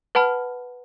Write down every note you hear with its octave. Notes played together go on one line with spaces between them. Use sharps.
B4 F#5 A5 B5 F6